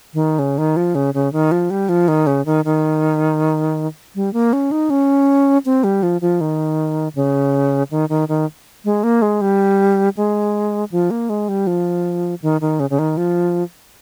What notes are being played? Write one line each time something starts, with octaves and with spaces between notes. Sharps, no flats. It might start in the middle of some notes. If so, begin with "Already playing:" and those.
D#3
C#3
D#3
F3
C#3
C#3
D#3
F3
G3
F3
D#3
C#3
D#3
D#3
G3
A#3
C#4
D#4
C#4
C4
G3
F3
F3
D#3
C#3
D#3
D#3
D#3
G#3
A#3
G#3
G3
G#3
F3
A#3
G#3
G3
F3
D#3
D#3
C#3
C#3
D#3
F3